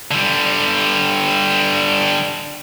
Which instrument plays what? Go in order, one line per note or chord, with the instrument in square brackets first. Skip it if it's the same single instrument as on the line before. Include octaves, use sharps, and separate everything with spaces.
[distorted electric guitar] D3 G3